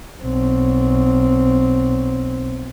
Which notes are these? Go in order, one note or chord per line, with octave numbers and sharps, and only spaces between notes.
B1 C4